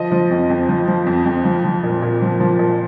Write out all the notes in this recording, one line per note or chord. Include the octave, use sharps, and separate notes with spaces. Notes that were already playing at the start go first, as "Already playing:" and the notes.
Already playing: F3 D#5
F3
F2
F2
F3
F3
F2
F2
F3
F3
A#2
A#2
F3
F3
A#2